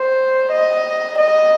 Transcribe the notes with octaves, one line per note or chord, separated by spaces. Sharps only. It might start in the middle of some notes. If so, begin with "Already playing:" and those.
Already playing: C5
D#5
D#5